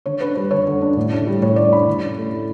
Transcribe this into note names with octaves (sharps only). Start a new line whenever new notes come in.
D3 C#5
D4 B4
G3 B4
D3 C#5
D3
D4
A2
D4
G3
A2 C#5
A2 D5
D4 B5
D3
C#4
A3
E4